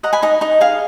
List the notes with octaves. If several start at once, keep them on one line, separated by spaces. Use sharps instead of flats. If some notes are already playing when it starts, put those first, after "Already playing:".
D#5 F#5 A#5
G#5 B5
D#4 D#5
D#4 D#5
G#4 F5